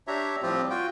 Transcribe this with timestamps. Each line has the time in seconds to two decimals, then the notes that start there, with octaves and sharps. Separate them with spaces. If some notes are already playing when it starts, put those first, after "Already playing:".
0.07 D4 G4 C#5 E5 A#5
0.42 A2 F3 G3 C4 F4 G4
0.70 F4 F#4 G5